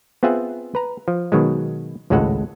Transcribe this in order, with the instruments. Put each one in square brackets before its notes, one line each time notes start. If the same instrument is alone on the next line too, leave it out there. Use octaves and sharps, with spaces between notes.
[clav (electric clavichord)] B3 C4 F4 G#4 E5 F#5
B4 A#5
F3
B2 D#3 F#3 G#3
G#1 C#2 A2 G#3 A4 F#5